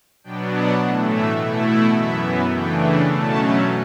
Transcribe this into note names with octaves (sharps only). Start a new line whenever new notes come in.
B2 F#3 B3 D4 G5
F#5
A2 E3 A3
E5
B2 A3 E4
F#5
F#2 E3 B3 E5
C#3 E3 A3 D4 G5
B2 F#3 A3 C#4 A5